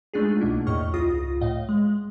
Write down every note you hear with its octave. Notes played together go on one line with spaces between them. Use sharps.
G#3 A3 D4 D#4 F4 G#4
C2 B2 A#3 E4
E2 A2 D#5 C#6 F6
G#1 C#2 F4 D#6 A#6
A2 D#5 F5
G#3